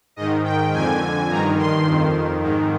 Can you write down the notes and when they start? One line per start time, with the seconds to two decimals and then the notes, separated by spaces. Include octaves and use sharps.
0.16 G#2 D#3 D#5
0.44 G5
0.73 F2 D3 G#5
1.30 G2 D#3 A#5
1.58 C6
1.87 F2 D#3
2.43 G#2 D#3